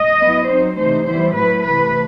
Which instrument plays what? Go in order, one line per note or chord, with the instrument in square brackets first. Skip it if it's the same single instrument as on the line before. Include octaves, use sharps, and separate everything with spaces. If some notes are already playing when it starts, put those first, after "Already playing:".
Already playing: [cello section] D#5
F#3 B3 E4
F#3 C4 D#4 C5
C3 E3 A3 D#4 C5
E3 G3 B3 E4 C5
A2 F#3 A3 E4 B4
C3 E3 A3 B4